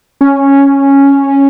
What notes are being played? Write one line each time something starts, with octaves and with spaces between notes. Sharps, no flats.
C#4